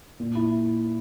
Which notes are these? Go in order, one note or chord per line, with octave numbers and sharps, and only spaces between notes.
A#2
E4